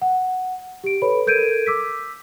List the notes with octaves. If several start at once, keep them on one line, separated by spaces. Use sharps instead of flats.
F#5
G4 D7
A4 B4 C#5 B5
A4 A#4 G6 G#6 D7 D#7
D6 E6 B6